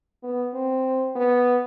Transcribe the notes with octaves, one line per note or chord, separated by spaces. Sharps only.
B3
C4
B3